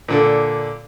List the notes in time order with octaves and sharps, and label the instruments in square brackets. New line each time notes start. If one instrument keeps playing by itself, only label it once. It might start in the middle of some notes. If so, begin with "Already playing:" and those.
[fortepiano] A#2 D3 A4